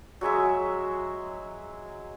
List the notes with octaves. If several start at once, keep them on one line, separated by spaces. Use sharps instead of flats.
F#3 G#3 G#4 E5